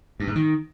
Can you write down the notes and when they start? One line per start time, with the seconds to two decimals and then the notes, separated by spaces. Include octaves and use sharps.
0.20 G2
0.28 G#2
0.35 D#3